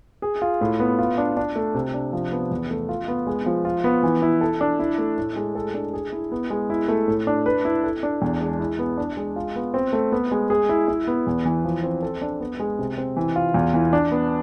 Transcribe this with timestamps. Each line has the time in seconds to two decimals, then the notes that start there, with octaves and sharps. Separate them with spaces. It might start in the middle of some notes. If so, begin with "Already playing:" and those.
0.22 G#4
0.42 F4
0.61 A2
0.80 B3
0.99 F4
1.18 D4
1.37 D4
1.56 A3
1.75 C3
1.94 D4
2.13 F3
2.32 B3
2.51 E2
2.70 A3
2.89 F4
3.08 B3
3.27 G#3
3.46 F3
3.65 F4
3.84 B3
4.03 E3
4.22 E4
4.41 A4
4.61 D4
4.80 E4
4.98 A3
5.18 A2
5.36 G#3
5.55 A4
5.74 D4
5.94 G#4
6.13 E4
6.32 B3
6.50 G#3
6.70 E4
6.88 A3
7.08 A2
7.27 D4
7.46 B4
7.65 E4
7.84 A4
8.03 D4
8.22 E2
8.41 G#3
8.60 E4
8.79 B3
8.97 D4
9.17 G#3
9.36 F4
9.56 B3
9.74 C4
9.93 A3
10.12 B3
10.32 G#3
10.50 G#4
10.69 E4
10.88 E4
11.07 B3
11.27 E2
11.45 E3
11.65 F3
11.83 C4
12.03 A4
12.22 D4
12.41 B3
12.60 G#3
12.79 C3
12.98 C4
13.17 E3
13.36 F4
13.54 E2
13.74 E3
13.93 D4
14.11 B3